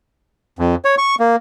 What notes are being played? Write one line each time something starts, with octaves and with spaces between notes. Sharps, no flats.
F2
C#5
C#6
A#3